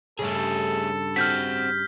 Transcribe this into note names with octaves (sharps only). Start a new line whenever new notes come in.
G2 C#3 A3 G#4 A4
C4 F#4 F6 G6 B6